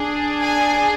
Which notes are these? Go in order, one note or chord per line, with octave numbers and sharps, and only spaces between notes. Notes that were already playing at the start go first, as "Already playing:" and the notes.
Already playing: D4 G#4
G#5